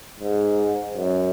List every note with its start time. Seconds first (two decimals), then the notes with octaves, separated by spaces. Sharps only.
0.20 G#2
0.95 F#2